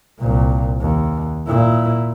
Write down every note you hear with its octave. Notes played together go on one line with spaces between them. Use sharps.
C2 A#2
D#2
A#2 E4